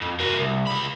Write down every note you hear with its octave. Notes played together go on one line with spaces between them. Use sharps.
F2
A#3 F#4
C2
C#2 B5